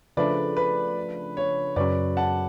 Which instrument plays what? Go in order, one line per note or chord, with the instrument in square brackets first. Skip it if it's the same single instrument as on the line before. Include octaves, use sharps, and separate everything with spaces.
[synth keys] C#3 F3 A3 D4 [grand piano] B4 D5
[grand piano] B4
C#5
[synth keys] F#2 C#3 F#3 C#4 [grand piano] B4 D5
[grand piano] F#5 A5